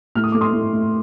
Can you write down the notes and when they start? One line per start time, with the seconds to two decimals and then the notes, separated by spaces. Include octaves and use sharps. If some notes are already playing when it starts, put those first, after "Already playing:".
0.15 A2 F6
0.24 D#6
0.32 A3 D6
0.41 C6 D#6
0.53 A2
0.73 A2